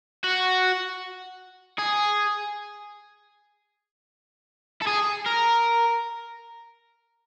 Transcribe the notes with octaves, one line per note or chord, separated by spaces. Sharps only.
F#4
G#4
A4
G#4
A#4